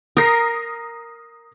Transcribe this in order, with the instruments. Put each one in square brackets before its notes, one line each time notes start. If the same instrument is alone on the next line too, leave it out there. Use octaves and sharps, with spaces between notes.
[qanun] A#4 [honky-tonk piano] D#6 A#6 C7